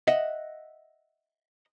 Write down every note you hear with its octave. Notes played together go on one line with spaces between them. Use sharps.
D#5 E5 F#5